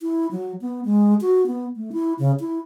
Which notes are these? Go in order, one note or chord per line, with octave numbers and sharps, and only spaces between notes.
E4
F#3
B3
G#3
F#4
B3
A3
E4
C#3
E4